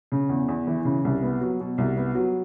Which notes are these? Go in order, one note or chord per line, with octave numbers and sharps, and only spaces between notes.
C#3
E2
E2
E3
C#3
C2
B3
F#3
B2
C2
B3
F#3